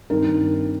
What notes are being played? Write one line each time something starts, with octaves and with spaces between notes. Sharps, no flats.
G2 D#3 C4 D#4 A#4